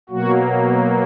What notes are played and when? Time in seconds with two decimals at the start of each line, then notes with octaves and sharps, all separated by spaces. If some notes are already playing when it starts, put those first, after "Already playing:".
0.10 B2 F#3 A#3 F#4